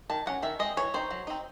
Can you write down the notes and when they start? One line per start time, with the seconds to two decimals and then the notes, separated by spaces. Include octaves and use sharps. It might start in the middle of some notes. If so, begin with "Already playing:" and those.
0.10 D#3 A5
0.26 F#3 C#4 F#5
0.43 D#3 E5
0.59 G#3 C4 D#5
0.77 E3 C#5
0.94 C4 D#4 C5
1.11 F#3
1.27 C4 D#4